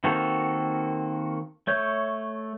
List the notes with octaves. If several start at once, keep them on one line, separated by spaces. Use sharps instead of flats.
D#3 A#3 C4 F#4 A4
A3 C#5 G6